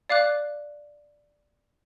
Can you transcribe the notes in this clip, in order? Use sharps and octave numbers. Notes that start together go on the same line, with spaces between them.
D5 F5 D6 F#6